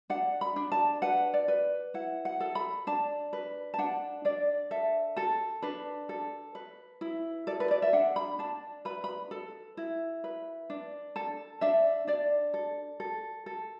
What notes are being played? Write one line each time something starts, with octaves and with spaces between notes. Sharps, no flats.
D4 F#5
B5
D4
A5
B4 F#5
D5
B4
E4 F#5
F#5
A4
B5
D4 A5
B4
A5
D4 F#5
D4 D5
A4 E5
A4 A5
D4 B4
A4
B4
E4
A4 D5
B4
D5
E5
D4 F#5
B5
D4 A5
B4 B5
B5
A4
E4
B4
D4
A4 A5
D4 E5
D4 D5
A4
A4
A4